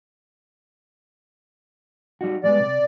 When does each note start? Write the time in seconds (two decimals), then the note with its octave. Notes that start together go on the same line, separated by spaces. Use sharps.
2.21 G3 D#4 F#4
2.44 G3 G#3 B3 D5
2.60 C3